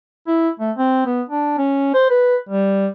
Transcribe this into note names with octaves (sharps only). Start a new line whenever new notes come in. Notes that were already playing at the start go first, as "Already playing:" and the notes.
E4
A3
C4
B3
D4
C#4
C5
B4
G3